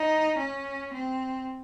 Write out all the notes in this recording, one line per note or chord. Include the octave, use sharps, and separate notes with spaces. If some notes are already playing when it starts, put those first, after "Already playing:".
Already playing: D#4
C#4
C4